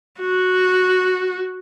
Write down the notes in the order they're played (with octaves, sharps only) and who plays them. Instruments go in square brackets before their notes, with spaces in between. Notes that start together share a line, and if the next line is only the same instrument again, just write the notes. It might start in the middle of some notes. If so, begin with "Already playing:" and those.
[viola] F#4